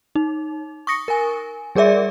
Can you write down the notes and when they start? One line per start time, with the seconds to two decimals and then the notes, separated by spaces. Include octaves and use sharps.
0.15 D#4
0.87 C#6 D#6 A#6 C#7
1.08 A#4 G#5
1.75 G3 G#4 A#4 D5 E5